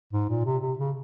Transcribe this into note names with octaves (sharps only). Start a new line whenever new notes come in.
G#2
A#2
C3
C3
C#3